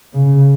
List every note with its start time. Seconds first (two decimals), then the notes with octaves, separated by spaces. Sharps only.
0.14 C#3